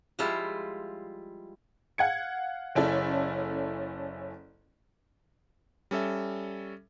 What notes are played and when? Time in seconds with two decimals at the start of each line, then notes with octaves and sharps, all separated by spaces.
0.19 F3 G3 G#3 E4 F4
1.98 F5 F#5 G#6 C#7
2.75 F#1 C#4 E4 A4 D5
5.91 G3 C#4 A4 E5